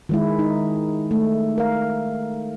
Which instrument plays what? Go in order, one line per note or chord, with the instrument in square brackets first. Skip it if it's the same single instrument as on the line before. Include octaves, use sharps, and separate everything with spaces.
[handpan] D#3 G#3 E4
D#4
A3
A#4 F5